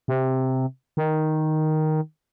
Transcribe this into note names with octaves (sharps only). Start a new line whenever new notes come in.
C3
D#3